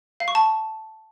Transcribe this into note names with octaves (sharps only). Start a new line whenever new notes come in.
F5
C#6
A5